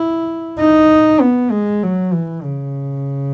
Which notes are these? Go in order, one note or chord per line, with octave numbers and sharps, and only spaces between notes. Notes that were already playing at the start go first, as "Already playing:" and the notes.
Already playing: E4
D#4
B3
G#3
F#3
E3
C#3